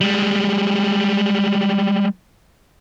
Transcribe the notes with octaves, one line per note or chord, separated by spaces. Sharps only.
G3 G#3